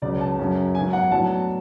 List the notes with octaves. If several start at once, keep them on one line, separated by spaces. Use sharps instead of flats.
C#2 C#3 F#3 C#4 D5
A5
F#2 C#3 F#3 C#4
G#2 F#3 B3 G#5
F#5
A2 F#3 B3 D4 A5